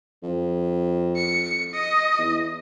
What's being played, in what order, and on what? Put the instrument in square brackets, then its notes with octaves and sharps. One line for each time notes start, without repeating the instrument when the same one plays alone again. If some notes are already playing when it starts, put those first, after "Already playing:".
[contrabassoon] F2
[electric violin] C#7
D#5
[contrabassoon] E2